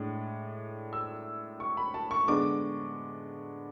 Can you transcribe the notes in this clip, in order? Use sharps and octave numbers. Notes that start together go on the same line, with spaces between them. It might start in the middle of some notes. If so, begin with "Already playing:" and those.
Already playing: A2 G#3 D4
E6
C#6
B5
A5
C#6
D3 G#3 B3 D4 D6